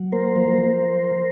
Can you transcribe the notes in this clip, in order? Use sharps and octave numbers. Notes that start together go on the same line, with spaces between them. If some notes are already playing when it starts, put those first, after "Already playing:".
Already playing: F#3
A#3 A#4 C5
F3
F3